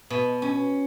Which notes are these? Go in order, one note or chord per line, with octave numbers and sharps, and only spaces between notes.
B2
C#4